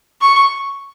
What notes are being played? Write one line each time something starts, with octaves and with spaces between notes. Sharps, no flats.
C#6